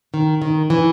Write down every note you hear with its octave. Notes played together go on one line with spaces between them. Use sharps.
D#3
D#3
E3